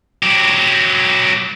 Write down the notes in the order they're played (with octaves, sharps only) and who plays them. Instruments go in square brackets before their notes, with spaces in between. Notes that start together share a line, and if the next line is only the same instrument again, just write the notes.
[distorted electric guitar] F#3 G4